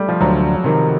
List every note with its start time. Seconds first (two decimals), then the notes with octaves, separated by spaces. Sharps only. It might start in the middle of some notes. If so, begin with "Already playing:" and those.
Already playing: G3 A3
0.09 F3
0.21 D2 F#3
0.64 C3 D#3